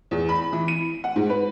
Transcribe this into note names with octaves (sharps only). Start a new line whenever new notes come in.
E2
B5
E3
D#7
F#5
G#2
B4